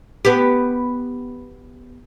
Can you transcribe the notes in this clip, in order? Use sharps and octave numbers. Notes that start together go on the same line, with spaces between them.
B3 G4